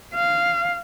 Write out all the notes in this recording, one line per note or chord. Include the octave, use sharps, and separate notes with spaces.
F5